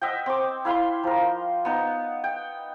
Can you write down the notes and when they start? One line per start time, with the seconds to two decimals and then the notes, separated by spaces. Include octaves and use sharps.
0.02 D#5 E5 F#5 G5
0.26 C4 D6
0.65 E4 F5 B5 C6
1.04 F3 A#4
1.65 B3 D#4
2.24 G5